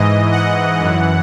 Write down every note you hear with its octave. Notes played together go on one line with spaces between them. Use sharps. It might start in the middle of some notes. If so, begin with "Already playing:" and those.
Already playing: G#2 E3 D#5
F#5
F#2 E3